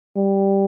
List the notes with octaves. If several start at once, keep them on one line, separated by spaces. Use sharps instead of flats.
G3